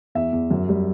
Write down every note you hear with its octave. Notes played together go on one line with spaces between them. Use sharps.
E2 E5
E2
F#2
G3